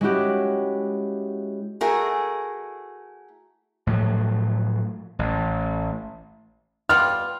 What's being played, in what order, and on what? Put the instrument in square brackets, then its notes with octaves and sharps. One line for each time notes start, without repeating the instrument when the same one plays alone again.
[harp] G#3 C#4 E4 F#4 G4
[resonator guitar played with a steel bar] A3 E4 F#4 G#4 A#4
[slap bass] A2 F3 F#3
A1
[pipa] G3 B3 F4 [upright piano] F6